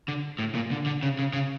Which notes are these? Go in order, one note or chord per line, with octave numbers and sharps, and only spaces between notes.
D3
A2
A#2
D3
D3
C#3
C#3
C#3